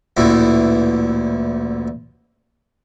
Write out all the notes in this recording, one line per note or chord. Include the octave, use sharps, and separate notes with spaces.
A1 D2 A#2 E3